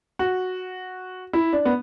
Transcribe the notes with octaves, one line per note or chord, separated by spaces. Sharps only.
F#4
E4
D4
B3